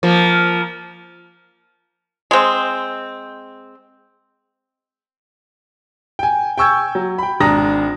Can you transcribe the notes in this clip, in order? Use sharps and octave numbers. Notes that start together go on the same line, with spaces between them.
F3 A#3
G#3 C4
G5 G#5
G5 G#5 C#6 E6 G6 G#6
F#3
G5 B5
G#1 D4 A5 A#5 D#6 A#6